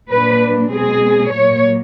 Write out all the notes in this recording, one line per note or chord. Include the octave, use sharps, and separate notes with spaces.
A#2 F#3 A#3 D4 B4
B2 G#3 C4 G#4
A#2 F#3 A#3 C#5